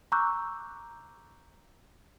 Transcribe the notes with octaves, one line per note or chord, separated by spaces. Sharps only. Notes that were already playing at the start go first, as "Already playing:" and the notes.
A#5 C#6 D6 E6 F#6 G6